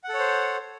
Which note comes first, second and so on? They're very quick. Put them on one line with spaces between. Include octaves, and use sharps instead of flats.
F#5 A4 C#5 C5